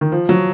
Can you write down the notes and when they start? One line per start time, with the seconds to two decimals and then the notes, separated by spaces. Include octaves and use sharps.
0.01 D#3
0.12 F3
0.29 F#3